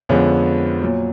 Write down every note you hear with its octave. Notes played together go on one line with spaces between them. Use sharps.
F2 D3 F3 G#3 B3 C#4
A#2 F#3